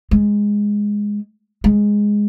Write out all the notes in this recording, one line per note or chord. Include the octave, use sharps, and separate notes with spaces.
G#3
G#3